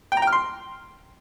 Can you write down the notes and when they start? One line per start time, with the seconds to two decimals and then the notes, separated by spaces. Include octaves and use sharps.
0.12 G5
0.17 A#5
0.22 G5
0.27 F6
0.33 C6